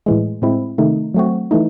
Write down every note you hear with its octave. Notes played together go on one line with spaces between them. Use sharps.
A2 E3 G#3
A2 G#3 C4 E4
C3 D#3 A3 D#4
F#3 A3 C4 F#4
E3 A3 D#4